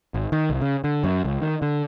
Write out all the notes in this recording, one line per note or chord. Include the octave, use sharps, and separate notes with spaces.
G#1
D#3
C2
C#3
D3
F#2
C#2
D#3
D3